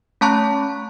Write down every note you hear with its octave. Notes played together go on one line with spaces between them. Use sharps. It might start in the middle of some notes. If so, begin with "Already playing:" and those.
A3 C#4 A5 A#5 C#6 F#6